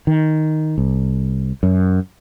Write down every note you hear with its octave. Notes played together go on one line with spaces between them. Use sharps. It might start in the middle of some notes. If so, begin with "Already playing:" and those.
D#3
C2
F#2